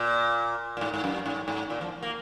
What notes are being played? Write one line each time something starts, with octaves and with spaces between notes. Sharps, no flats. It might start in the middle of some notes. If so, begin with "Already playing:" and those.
Already playing: A#2
A#2
G#2
G#2
F#2
G#2
G#2
A#2
F3
A#3